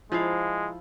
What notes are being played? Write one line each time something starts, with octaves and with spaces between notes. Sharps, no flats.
F3 G#3 E4 F5